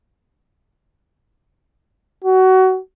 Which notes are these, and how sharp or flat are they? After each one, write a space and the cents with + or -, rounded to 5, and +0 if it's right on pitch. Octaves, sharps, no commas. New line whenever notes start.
F#4 +20